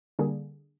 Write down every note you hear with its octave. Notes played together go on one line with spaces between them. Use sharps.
D3 G3 A#3 G#4